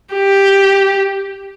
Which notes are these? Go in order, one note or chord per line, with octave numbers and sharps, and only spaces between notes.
G4